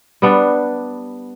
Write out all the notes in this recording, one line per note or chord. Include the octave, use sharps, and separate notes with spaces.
G3 B3 D4